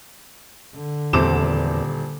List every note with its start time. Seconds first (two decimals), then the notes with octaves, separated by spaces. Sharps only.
0.75 D3
1.13 D#1 E2 C3 A4 C5 D6 E7